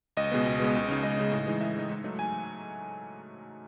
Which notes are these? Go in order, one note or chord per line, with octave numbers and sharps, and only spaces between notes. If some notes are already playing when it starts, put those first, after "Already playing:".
C#2 D#5
B2 G#3 B3
C#2
B2 G#3 B3
C#2
C#3 G#3 D#4
C#2 D#5
C#3 G#3 D#4
A2
E3 G#3 D#4
A2 E5
E3 G#3 D#4
G#2
F#3 A3 D#4
G#5